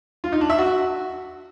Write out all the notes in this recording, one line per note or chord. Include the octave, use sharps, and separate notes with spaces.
F4
D#4
D4
E5
F#4